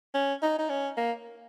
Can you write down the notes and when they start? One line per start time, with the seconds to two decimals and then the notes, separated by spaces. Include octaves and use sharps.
0.14 C#4
0.43 D#4
0.58 D#4
0.69 C#4
0.97 A#3